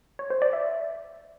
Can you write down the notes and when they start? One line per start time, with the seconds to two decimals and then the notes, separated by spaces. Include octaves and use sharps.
0.19 C#5
0.30 C5
0.42 D5
0.53 E5